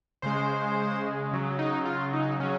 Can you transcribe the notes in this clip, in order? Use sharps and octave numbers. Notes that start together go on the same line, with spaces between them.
C#3 G#3 C5
C#3 F#3
D#4
F4
D#4
C#3 F#3 C#4